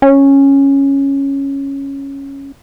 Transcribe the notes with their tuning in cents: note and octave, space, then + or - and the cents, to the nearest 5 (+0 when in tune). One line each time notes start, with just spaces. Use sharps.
C#4 -5